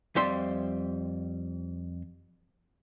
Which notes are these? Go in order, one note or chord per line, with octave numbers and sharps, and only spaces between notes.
F2 G3 C5 E5 C6